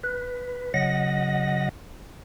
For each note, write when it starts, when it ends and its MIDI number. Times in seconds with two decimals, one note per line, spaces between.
0.03 0.73 71
0.74 1.69 49
0.74 1.69 54
0.74 1.69 75
0.74 1.69 78
0.74 1.69 94